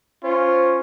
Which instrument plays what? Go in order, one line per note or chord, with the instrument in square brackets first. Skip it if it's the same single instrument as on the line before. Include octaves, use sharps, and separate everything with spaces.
[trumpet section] C#4 F4 [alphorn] C5